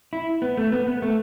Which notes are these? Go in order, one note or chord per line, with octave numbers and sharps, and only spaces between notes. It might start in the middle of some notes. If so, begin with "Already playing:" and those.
E4
B3
A3
B3
B3
A3